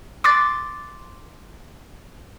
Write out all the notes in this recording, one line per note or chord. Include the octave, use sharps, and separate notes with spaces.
C6 D6 F#6 A6